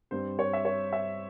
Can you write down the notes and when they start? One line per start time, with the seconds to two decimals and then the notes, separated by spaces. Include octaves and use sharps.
0.11 G2 G3 C4 C5
0.39 C#5
0.53 E5
0.65 C#5
0.93 E5